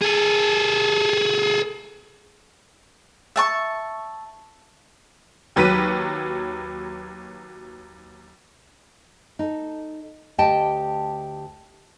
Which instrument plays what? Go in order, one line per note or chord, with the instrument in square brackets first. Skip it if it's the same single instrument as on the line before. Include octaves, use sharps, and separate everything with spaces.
[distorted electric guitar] G#4 A4
[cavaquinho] E5 A5 C#6
[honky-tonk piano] D#2 F#3 B4 B6 D#7
[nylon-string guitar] D#4 A4
D2 G4 D#5 G5 A5